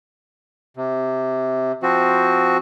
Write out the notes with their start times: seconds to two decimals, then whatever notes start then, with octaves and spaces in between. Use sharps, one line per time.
0.77 C3
1.83 F3 C4 F#4